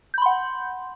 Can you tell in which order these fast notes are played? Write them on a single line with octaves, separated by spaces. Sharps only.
G6 B5 C6 F#5